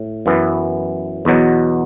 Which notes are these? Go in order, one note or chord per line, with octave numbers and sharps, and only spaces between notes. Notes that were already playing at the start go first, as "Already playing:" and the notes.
Already playing: A2
F#2 E3 B3
E2 B2 F#3